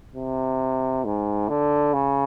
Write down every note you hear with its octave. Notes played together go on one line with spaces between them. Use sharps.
C3
G#2
D3
C#3